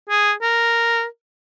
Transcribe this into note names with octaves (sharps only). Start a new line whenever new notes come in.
G#4
A#4